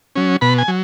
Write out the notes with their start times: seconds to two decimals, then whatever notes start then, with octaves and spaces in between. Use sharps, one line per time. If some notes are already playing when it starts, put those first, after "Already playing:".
0.16 F#3 C#4
0.41 B2 B5
0.58 G#5
0.68 F#3